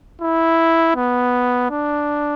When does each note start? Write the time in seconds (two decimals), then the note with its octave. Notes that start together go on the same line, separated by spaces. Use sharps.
0.21 E4
0.96 B3
1.70 D4